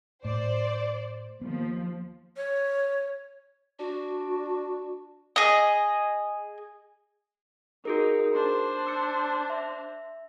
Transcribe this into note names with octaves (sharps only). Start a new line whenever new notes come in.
A2 C5 D5
D#2 F3 A#3 B3
C#5
D4 F#4
G#4 D#5
D#4 F#4 G#4 A#4
D4 C5
E6 C#7
E5